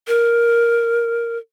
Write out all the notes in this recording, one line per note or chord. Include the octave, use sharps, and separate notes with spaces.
A#4